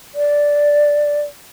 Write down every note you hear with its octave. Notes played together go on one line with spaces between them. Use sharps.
D5